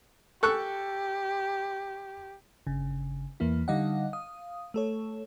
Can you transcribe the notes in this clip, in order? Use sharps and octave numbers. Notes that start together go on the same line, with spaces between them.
G4 A4 C#6 F#6
G1 C#3
E2 E3 A#3 E4
D3 G3 D#4 D#5 F5 F#5
F5 D#6
A3 A4 C#5